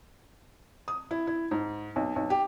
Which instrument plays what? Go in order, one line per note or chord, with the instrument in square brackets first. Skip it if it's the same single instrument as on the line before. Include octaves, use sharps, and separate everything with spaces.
[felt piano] D#6
E4
E4
G#2
B1
B1
G4